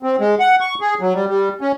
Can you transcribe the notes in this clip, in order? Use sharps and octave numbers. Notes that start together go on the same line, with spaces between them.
C4
G#3
F#5
C#6
G#4
F#3
G3
G3
C#4